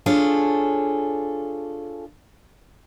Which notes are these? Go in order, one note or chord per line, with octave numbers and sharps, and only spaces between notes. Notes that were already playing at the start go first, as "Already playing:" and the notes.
D4 F4 G#4 A4 C#5